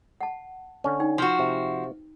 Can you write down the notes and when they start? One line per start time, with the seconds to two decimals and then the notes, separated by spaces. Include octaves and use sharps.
0.21 F#5 A5
0.84 D3 C#4
1.00 D#4 G5
1.18 F3 F#4
1.39 C3